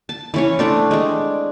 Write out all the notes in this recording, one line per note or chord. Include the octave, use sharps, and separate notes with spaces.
A5
E3 C#4 C#5
A3 C4 D4
G#3 D4